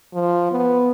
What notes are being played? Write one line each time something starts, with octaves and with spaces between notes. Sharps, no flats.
F3
B3